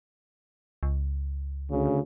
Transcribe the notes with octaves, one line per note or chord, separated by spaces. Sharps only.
C#2
D2 C#3